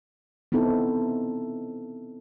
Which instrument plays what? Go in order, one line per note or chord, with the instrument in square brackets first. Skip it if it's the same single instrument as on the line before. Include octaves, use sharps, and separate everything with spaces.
[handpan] B3 C4 D#4 E4 A4